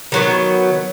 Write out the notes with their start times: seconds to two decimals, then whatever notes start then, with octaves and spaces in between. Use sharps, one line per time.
0.12 D#3 F#3 B3